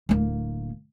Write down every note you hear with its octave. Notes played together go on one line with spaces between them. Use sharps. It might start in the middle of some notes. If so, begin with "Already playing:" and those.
D1 A#3